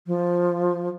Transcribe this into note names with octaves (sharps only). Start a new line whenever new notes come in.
F3